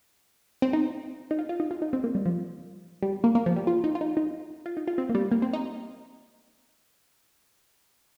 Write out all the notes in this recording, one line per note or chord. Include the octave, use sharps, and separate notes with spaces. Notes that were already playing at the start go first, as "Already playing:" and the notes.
C4
D#4
D#4
F4
F4
D#4
F4
D#4
C4
A#3
G3
F3
G3
A#3
A#3
F3
G3
F4
D#4
F4
D#4
D#4
F4
D#4
F4
C4
A#3
G3
A#3
C4
D#4